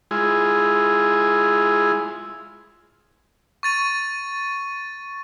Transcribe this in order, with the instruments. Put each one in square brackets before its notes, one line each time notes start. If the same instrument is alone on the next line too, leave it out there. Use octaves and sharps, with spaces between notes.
[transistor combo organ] G#3 E4 F4 G#4
[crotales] C#6 A6 D#7